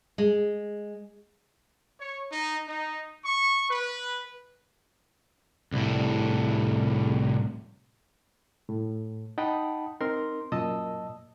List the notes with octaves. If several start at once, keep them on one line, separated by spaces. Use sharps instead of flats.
G#3
C#5
D#4
D#4
C#6
B4
C2 A2
A2
D#4 F#5 G5 A5 B5 D#6
C4 D#4 A#4 C6
F#2 A#2 D#5 A5 D#6 E6